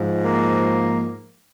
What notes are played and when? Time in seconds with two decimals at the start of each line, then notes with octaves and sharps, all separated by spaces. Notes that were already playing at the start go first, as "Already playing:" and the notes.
Already playing: G#2 F3
0.24 A#3